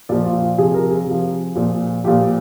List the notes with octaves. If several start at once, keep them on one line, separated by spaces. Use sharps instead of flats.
A#2 F3 D5
F4
F4
C3 F3 G#4
A#4
G#4
C3 F3
A#2 F3
A#2 F3 G4